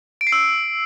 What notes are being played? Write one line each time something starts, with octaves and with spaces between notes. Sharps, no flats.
D7
C7
E6